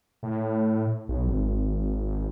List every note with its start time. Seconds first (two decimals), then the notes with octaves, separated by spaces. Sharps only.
0.23 A2
1.08 B1
1.27 G#1